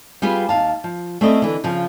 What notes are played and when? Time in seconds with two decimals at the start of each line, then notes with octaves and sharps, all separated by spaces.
0.22 G3 F4 G4 G#4 B4
0.49 D#2 F5 A5
0.84 F3
1.21 A3 C4 C#4 E4 D5 D#5
1.42 D3 E3
1.64 C#3 F3